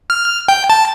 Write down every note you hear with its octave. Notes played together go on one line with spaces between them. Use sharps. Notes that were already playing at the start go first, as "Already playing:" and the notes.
F6
G5
A5